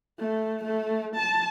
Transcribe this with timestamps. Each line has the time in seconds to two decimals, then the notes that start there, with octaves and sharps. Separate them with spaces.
0.19 A3
0.63 A3
1.15 A5